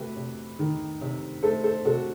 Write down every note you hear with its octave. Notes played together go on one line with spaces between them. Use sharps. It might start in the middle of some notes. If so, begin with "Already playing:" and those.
Already playing: C3 A3 F#4 G4 B4
C3
D#3
C3
A3 A4 C5
A4 C5
C3 F#4 A4